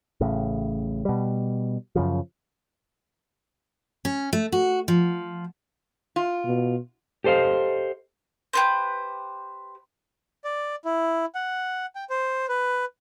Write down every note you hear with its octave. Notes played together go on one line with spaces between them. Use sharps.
A1 A2 C#3
B2 G3
F#2 C#3 F3
C#4
A3
F#4
F3
F4
B2
G4 A4 C5 D#5 F5
G4 B4 C5
D5
E4
F#5
G5
C5
B4